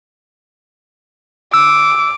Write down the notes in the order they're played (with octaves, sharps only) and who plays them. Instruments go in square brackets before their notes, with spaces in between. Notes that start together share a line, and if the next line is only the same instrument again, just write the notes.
[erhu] D6 [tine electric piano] E6